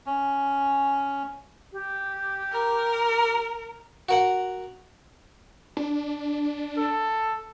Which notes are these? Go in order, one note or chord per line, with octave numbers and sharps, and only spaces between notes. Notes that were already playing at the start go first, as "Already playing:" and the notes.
C#4
G4
A#4
F#4 A#4 F#5
D4
A4